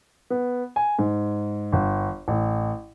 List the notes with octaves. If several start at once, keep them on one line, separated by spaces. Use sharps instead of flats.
B3
G#5
G#2
G1
A1